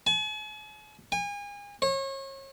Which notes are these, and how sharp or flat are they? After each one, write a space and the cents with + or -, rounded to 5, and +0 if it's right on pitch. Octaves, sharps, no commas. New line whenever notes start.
G#5 +45
G#5 -35
C#5 -35